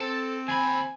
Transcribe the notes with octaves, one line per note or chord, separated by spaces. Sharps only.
C4 A4
D#2 G#5 B5